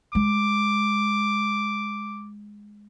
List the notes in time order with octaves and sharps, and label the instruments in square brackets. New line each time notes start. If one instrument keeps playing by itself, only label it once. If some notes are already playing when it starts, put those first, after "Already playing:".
[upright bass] G#3 [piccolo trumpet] D6